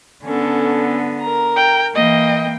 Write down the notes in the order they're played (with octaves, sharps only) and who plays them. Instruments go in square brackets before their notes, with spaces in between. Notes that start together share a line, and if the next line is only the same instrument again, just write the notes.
[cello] D3 B3 [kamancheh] C#4 A4
[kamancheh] A#4 A#5
[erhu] G5
[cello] E3 A#3 [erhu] D#5 [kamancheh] G5